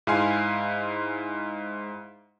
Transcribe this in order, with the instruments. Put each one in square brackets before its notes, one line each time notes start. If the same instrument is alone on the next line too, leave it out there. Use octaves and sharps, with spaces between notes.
[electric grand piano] G#2 E4 F5 G#5 C6 C7